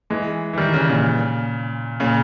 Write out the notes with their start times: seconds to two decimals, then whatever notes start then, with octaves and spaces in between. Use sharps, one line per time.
0.10 E3 G#3
0.53 E3
0.58 D#3 G3
0.73 C#3 E3
0.89 A#2 C#3
2.00 A#2 C#3